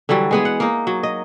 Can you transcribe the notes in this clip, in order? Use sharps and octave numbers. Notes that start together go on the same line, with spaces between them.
D3 E3 F#3 G3
G#3 B3 G#4
F#5
A#3 D#4
F#3
D#5